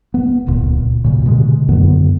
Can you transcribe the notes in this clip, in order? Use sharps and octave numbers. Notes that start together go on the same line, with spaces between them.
B3
D1 C#2 A#2
A#2 C#3
B2 D3 G#3
F#2 D3 B3